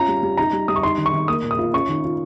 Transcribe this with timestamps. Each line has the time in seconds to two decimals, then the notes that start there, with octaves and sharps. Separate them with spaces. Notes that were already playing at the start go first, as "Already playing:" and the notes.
Already playing: C#4 F4 A#5
0.08 G3
0.23 G3
0.37 D#4 A#5
0.53 G3
0.68 G3 D#6
0.76 C#6
0.83 D#4 C6
0.98 D#3
1.06 C#6
1.13 D#3
1.28 A#3 D#6
1.44 A#2
1.51 D#6
1.58 F4
1.74 C#4 C#6
1.89 D#3
2.04 F4